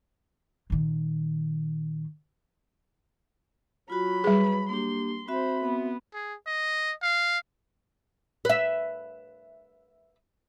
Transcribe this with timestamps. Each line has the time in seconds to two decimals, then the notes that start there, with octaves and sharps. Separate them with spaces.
0.70 A#2 D#3
3.90 F#3 F4 F#4 B5
4.24 G3 G#4 B4
4.69 A#3 D4 G4 C6
5.28 C4 F#4 C5 E5 B5
5.65 B3
6.14 G#4
6.47 D#5
7.03 F5
8.45 B4 E5